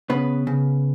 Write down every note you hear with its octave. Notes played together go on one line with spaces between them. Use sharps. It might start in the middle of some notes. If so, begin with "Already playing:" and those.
C#3 B3 B4
C#3